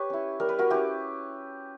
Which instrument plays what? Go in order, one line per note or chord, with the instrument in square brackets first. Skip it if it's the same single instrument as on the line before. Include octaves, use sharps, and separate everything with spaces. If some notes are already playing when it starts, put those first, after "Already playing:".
Already playing: [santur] G4 B4 C#5
C#4 E4
G3 A#4
B4
F#4 A#4
C#4 E4 G4 B4